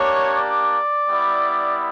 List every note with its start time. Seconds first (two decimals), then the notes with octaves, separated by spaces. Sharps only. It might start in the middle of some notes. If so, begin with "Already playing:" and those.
Already playing: A#3 D4 G4 C#5
0.35 D5
1.10 G3 B3 E4